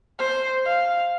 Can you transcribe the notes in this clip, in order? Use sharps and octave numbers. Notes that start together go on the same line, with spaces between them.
C5
F5